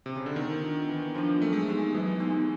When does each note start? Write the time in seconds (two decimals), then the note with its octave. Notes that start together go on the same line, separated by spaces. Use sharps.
0.06 C3
0.16 C#3
0.26 D3
0.36 D#3 B3
0.62 D4 F4
0.88 E3 B3
1.15 F3 D4 F4
1.41 F#3 A3
1.53 G#3
1.63 A3
1.69 B3 D#4 G4
1.94 E3 F#3
2.20 B3 D#4 G4